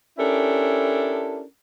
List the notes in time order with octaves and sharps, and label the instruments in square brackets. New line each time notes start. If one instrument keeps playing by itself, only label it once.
[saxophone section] C#4 D4 E4 G4 A4 A#4